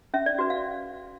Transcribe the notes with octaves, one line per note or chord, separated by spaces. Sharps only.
C#4 E5
D5
F#4 B4
F5